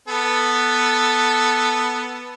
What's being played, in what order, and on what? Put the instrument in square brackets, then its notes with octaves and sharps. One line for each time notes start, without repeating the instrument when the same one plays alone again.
[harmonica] B3 A4